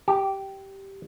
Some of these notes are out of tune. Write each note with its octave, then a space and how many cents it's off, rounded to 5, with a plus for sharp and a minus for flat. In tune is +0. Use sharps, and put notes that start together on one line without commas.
G4 -10